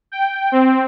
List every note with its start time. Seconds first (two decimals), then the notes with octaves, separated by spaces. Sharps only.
0.12 G5
0.52 C4